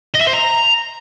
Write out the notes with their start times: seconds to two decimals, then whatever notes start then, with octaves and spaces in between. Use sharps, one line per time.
0.14 D#5
0.21 E5
0.27 C5
0.33 A#5